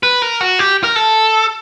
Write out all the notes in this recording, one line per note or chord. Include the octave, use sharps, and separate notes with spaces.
B4
A#4
F#4
G4
A#4
A4